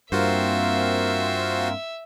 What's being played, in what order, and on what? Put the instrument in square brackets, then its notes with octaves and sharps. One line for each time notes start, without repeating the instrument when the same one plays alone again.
[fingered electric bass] G2 [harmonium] A#3 C4 A#4 [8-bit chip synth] F4 F#4 C5 [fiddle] E5